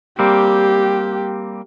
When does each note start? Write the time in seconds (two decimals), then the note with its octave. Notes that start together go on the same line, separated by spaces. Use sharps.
0.19 G3 A#3 C4 G4